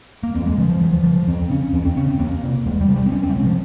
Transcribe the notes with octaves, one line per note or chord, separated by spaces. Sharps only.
A#3
E2 C4
G#3
C#3 F3
F3
E2 E3
F3
C#3 F3
F3
E2 C4
C#3 C#4
E2 C4
C4
C#3 C#4
C4
E2 A#3
C3
E2 G#3
G3
C3
G3
C4
E2 C#4
C4
G3
C3 G#3
F3